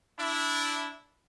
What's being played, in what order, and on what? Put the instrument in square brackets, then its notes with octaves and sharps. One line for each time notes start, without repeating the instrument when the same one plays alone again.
[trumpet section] D4 E4